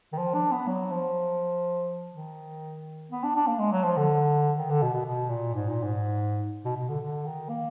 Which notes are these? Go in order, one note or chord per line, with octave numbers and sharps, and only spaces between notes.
D#3
F3
D4
B3
F#3
F3
D#3
B3
D4
D4
A#3
G#3
F#3
F3
D3
D#3
D3
B2
B2
B2
A#2
G#2
A#2
G#2
B2
B2
D3
D3
D#3
A#3